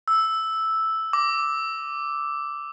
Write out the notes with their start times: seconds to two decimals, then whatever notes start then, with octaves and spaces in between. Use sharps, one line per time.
0.08 E6
1.13 D6